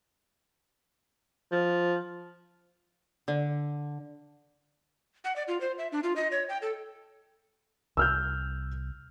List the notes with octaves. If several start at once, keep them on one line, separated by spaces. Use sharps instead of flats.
F3
D3
F#5
D5
F4
C5
E5
D4
F4
D#5
C#5
G5
A4
C2 E6 F6 G6